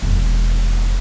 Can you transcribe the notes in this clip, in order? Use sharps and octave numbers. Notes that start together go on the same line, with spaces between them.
E1 F2